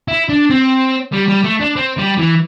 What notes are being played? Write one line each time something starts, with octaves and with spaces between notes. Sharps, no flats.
E4
D4
C4
G3
G3
A3
D4
C4
G3
E3